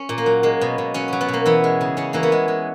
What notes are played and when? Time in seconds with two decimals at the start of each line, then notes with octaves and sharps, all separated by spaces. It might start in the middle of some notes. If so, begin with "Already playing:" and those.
Already playing: C#4
0.09 A#2
0.18 A#3
0.26 F#3
0.43 G#3 A#3
0.61 B2
0.78 B2
0.94 F#3 C#4
1.08 F#3 B3
1.21 B3
1.28 B2 A#3
1.46 E3 B3
1.64 G#3
1.81 C#3
1.97 C#3 C#4
2.13 E3 A#3
2.23 B3
2.32 G#3
2.48 G#3